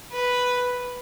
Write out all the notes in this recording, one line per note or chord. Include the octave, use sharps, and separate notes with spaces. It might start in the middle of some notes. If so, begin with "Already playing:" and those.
B4